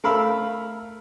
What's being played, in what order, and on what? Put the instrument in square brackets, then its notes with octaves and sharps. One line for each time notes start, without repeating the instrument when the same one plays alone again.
[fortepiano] A3 A#4 F5 B5 E6